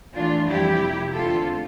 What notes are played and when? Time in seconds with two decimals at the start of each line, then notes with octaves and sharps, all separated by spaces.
0.14 A2 E3 A3 D4 F4
0.48 F2 E3 G3 C4 E4 G4
0.81 C3 F3 A#3
1.14 E2 D3 A3 C4 F4 A4